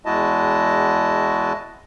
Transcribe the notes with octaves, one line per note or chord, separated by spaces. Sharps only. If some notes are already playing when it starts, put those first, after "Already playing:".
E2 G#3 E4 F#4 D#5 A5